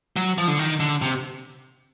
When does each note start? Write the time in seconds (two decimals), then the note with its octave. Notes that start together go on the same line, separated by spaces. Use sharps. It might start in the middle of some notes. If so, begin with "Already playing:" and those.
0.16 F#3
0.38 F3
0.48 D3
0.59 D#3
0.80 D3
1.02 C3